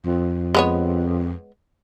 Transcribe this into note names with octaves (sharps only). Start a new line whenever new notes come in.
F2
G#3 B3 C#5